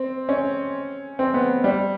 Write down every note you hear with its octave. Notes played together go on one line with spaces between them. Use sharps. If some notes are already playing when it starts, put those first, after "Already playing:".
Already playing: C4
C#4
C4
B3
G3